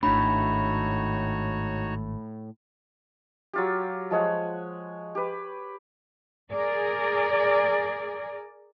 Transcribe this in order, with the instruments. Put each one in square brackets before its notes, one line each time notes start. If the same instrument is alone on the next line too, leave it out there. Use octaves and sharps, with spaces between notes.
[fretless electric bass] G#1 D4 [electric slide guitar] A2 [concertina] D#4 F#4 C#5 [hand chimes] B5
[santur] F#3 F4 G4
F3 G#3 C#5 F#5
G4 B4
[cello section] G#4 A#4 D5